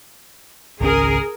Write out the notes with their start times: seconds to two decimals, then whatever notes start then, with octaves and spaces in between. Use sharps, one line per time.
0.81 G#1 C#2 C#4 G#4 A#4